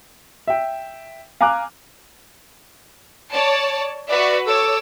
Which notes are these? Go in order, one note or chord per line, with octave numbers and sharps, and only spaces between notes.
E5 G5
F5 G#5 A#5 D6 F6 F#6
C#5 D5 A5
F#4 B4 D5 E5
A4 C#5 D6 E6